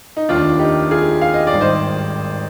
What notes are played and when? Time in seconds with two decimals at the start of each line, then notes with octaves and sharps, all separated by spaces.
0.17 D#4
0.29 F1 D#2 D#3 D4 F4
0.59 D#4 G4
0.91 F4 G#4
1.21 F5
1.34 D#5
1.47 D5
1.53 G#1 G2 D#3
1.61 C5 D#5